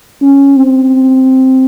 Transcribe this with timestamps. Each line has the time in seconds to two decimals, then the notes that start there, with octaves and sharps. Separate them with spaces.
0.22 C#4
0.57 C4